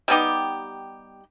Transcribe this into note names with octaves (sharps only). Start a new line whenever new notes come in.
G3 B3 D#4 G4